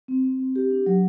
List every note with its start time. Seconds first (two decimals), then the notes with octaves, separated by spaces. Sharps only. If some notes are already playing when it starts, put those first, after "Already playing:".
0.08 C4
0.24 C4
0.40 C4
0.56 G4
0.70 D4
0.86 F#3